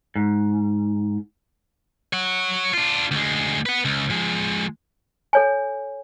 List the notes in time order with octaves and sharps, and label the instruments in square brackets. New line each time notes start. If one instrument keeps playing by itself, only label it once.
[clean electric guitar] G#2
[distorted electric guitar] C#5 F#5
D4 F4
D2 G#3
B4 F#5
C#2
F3 G#3
[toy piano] A4 C#5 G#5